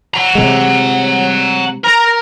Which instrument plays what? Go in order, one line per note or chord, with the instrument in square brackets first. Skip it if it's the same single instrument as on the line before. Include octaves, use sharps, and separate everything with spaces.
[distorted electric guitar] F#5 A#5
[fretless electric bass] C3 G#3
[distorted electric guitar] A#4 [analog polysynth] A#5